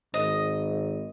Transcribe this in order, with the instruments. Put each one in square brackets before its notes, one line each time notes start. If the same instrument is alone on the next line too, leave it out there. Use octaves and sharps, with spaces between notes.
[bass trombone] G#1 [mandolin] D#5